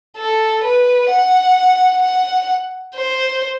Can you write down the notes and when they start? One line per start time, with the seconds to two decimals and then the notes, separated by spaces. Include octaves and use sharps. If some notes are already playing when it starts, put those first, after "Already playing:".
0.17 A4
0.64 B4
1.10 F#5
2.02 F#5
2.96 C5